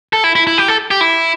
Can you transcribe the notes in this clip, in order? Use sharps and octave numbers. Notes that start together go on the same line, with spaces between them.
A4
E4
E4
E4
G4
A4
G4
E4